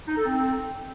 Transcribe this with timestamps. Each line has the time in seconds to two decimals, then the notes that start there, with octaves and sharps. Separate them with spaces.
0.06 D#4
0.16 A4
0.26 C4